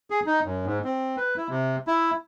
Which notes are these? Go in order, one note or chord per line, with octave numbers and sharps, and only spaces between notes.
G#4
D#4
F#2
G#2
C4
B4
E4
C3
E4